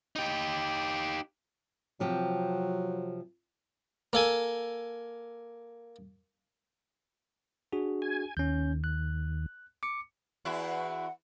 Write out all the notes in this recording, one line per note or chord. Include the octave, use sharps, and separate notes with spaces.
D#4 G4
C3 F3 F#3 G4
A#3 A4 G#5
D4 F#4 G#4
G#5
D#2 C#4 G6
F#6
D6 C#7
E2 E4 F#4
F#5